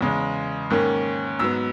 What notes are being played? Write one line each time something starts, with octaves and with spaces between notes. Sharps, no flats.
E2 C#3 G#3
G#2 D#3 A#3 C#4
G#2 F#3 B3 E6